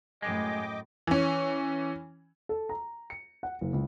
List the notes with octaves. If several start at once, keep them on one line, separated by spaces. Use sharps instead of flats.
F#2 A2 G#3 D#5 G5 D6
E3 C#4
A4
A#5
C#7
F#5
F#1
C#2